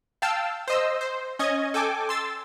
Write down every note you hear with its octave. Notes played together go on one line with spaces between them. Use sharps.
F5 G5 A5 E6
C5 D#5 E6
C5
C#4 D#5 G#6
A4 G5 G#5 D6
C6 E6 A6